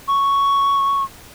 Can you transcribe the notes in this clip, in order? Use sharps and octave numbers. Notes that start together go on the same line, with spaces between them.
C#6